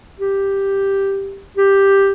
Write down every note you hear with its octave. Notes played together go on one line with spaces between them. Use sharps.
G4
G4